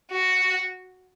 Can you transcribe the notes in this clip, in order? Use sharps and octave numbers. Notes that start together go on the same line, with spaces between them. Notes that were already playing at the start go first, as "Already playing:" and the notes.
F#4